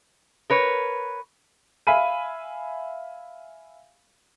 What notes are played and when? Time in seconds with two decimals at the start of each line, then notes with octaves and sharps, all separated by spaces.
0.50 A#4 B4 C#5
1.87 E5 F5 G#5 B5 D#7